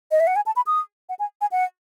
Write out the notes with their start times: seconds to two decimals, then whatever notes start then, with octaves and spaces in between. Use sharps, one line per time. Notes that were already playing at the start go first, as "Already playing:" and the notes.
0.11 D#5
0.20 E5
0.27 F#5
0.36 G#5
0.46 A5
0.56 B5
0.66 D#6
1.09 F#5
1.19 G#5
1.41 G#5
1.51 F#5